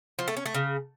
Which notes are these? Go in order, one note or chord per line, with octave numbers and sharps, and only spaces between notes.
F3
A3
C#4
A3
C#3